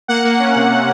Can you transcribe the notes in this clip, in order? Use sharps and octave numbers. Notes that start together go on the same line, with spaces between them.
A#3 F#5
A#3
C#4
C3
C3